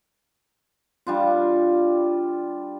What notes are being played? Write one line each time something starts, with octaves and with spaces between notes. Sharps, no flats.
G3 D4 F4